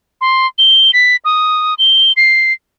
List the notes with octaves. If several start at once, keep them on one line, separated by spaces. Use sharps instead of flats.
C6
G7
B6
D#6
G7
C7